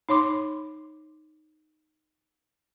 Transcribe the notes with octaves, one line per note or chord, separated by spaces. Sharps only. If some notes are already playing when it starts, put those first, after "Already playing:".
D#4 C#5 C6 D6